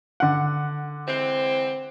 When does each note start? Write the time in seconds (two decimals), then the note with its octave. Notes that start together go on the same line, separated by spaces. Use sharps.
0.20 D3 F#5
1.07 E3 G#3 C4